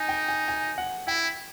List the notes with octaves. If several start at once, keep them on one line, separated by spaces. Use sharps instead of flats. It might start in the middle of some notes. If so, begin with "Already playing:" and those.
Already playing: D#4 G#5
G5
G#5
G#5
F#5
E4 G5